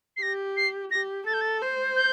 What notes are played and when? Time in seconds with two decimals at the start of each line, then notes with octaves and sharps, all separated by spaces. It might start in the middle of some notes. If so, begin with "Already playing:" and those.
0.17 C7
0.22 G4 A#6
0.57 C7
0.91 G4 A#6
1.27 A4 A6
1.34 G6
1.41 A6
1.62 C5
1.96 G6